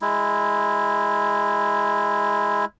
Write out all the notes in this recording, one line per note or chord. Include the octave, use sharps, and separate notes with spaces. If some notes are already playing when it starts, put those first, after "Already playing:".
G#3 E4